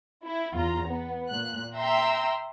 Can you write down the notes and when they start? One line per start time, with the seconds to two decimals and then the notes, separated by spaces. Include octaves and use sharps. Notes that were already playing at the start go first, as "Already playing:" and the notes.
0.25 E4
0.54 E2 F4 A#5
0.86 B3
1.29 A#2 F#6
1.77 E5 G5 A#5 C6 E6